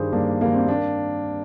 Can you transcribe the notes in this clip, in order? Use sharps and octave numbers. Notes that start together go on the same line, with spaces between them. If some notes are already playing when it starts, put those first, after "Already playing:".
Already playing: G2 D#3 G3 G#4 C5
G2 A#3 D4
D#3 G3 A#3
C4
A#3 D4